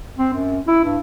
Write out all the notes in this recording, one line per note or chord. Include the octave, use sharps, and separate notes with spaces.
C4
F#2
E4
G2